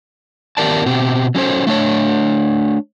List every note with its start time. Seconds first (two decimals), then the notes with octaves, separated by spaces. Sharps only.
0.57 D#3 B3 G4 A#4 D5 A5
0.86 B2 C4 G4
1.35 F#3 C#4 A4 C5
1.67 A3 D4 C#5